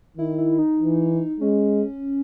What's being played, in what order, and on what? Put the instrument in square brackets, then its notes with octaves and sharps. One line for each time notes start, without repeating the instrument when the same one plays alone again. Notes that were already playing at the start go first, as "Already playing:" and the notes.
[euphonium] D#3 [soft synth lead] E4
[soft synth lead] E4
D#4
[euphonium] E3
[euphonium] G#3 [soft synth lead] C#4